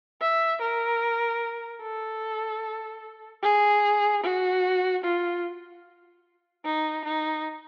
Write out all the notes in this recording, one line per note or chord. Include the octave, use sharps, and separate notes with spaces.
E5
A#4
A4
G#4
F#4
F4
D#4
D#4